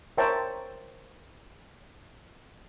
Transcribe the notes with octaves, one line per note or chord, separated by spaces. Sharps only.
A#4 C5 C#5 E5 G5 A5